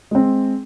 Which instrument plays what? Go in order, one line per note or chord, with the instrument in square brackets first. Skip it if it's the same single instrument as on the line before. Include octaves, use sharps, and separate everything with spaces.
[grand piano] G#3 C4